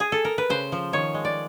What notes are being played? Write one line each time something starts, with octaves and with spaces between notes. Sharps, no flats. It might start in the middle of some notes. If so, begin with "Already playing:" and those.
G#4
A4
A#4
B4
C#3 C5
F3
D#3 C#5
G#3
D5